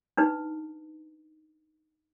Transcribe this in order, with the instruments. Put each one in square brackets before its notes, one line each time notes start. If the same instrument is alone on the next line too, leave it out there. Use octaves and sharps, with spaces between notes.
[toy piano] D4 D#4 B4